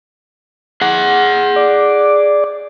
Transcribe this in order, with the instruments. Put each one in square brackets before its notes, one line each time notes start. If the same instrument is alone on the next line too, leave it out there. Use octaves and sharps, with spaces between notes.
[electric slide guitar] G#4 F#5
[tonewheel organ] D5